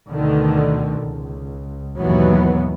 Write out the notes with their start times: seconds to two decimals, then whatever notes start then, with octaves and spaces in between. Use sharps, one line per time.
0.10 D2 B2 D3 D#3
1.01 C#2
1.99 D#2 G#2 B2 E3 F#3 B3